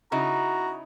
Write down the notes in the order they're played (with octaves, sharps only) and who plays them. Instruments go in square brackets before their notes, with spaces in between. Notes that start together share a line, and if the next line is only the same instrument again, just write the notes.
[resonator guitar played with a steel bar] C#3 D#4 E4 [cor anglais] F#4 [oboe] A#5